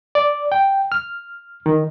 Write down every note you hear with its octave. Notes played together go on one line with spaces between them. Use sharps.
D5
G5
F6
D#3